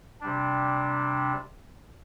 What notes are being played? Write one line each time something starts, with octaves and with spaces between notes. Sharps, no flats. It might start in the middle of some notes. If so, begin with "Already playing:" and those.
C3 G3 D4